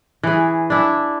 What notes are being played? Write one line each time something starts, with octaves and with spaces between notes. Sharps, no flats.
E3 G#4
D4 E4